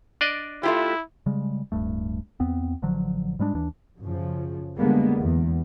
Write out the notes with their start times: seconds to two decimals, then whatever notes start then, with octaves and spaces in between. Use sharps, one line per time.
0.21 D4 D5 D#5
0.63 A3 E4 F4 G4
1.26 C#3 G3 G#3
1.72 D1 G2 A3
2.40 E2 B3 C4
2.82 A1 D3 F3 F#3
3.39 G#2 G3 G#3 D4
3.54 D#2 E3 D4
4.01 F#2 C#3 F3
4.77 D3 G3 G#3 A#3 B3
5.21 E2